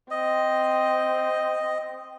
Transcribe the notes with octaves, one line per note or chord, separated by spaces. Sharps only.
C4 D#5